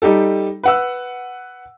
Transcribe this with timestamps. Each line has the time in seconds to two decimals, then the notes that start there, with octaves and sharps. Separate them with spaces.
0.02 G3 D#4 G4 A4
0.63 B4 F#5 E6